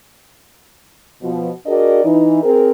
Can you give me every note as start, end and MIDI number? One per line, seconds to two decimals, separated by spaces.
1.22 1.50 47
1.22 1.50 53
1.66 2.04 62
1.66 2.04 66
1.66 2.04 68
1.66 2.04 70
1.66 2.04 74
1.66 2.04 75
2.04 2.42 52
2.04 2.42 63
2.43 2.71 60
2.43 2.71 68
2.43 2.71 70